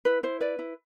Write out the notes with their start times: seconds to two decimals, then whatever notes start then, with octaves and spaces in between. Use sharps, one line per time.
0.05 E4 B4
0.23 E4 C5
0.41 B4 D5
0.59 E4